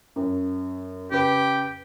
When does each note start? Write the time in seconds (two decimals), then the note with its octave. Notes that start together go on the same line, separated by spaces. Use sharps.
0.16 F#2
1.12 C#3 G4 B4